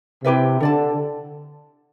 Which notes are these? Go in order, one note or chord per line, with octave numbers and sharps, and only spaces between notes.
C3 E4 G4 B4 E5
D3 A4 D5 A5